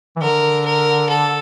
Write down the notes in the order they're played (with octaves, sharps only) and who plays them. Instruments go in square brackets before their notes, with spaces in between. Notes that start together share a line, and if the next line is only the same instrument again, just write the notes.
[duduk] E3
[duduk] D3 [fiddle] A#4
[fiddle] A#4
A4